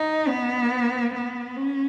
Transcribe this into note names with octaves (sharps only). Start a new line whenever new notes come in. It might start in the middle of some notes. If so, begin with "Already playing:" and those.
Already playing: D#4
B3
B3
C#4